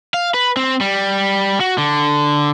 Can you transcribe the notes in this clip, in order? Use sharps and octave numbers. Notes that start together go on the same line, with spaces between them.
F5
B4
C4
G3
F#4
D3